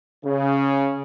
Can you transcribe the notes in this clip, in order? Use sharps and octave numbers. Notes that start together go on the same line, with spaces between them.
C#3